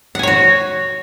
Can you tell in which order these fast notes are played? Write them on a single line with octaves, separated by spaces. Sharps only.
F#5 G#5 C#5 F#4